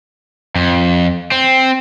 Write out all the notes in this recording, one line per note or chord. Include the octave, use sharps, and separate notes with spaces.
F2
C4